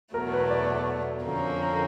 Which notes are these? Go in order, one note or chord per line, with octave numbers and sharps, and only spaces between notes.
E2 B2 F#3 A3 A#4
B4
D5
F2 D3 F3 A#3 C#4